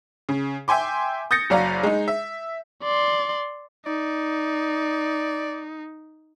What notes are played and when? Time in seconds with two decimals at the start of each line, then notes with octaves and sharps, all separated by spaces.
0.29 C#3
0.68 E5 G5 G#5 C6 D6
1.31 D#6 G6 A6 A#6 C#7
1.50 F#1 F#3 D5 F5 A#5
1.83 G#3 D#4
2.08 E5
2.83 D5 C6
3.86 D#4 D5